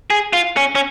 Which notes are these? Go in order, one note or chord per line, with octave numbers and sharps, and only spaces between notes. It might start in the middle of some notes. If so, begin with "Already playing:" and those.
G#4
F4
C#4
C#4